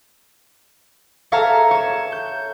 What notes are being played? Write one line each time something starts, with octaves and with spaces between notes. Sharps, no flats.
A4 C#5 E5 F5 A5 A#5
C#5 E7
G6